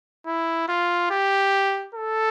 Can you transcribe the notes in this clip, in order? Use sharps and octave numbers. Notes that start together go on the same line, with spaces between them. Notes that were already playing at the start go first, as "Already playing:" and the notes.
E4
F4
G4
A4